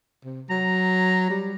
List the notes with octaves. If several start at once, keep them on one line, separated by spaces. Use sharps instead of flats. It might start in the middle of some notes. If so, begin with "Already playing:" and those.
C3
F#3 A#5
G3